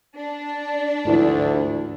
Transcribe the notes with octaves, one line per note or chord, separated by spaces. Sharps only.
D4
D2 G#2 E3 F3